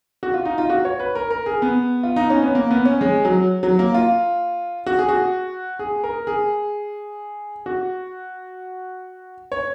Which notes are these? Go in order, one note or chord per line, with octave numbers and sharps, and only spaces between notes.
F#4
F4
D#4
F4
F#4
C#5
B4
A#4
A#4
G#4
B3
F4
D#4
C#4
B3
A#3
B3
C#4
G#3
F#3
F#3
A#3
F4
F#4
G#4
F#4
G#4
A#4
G#4
F#4
C#5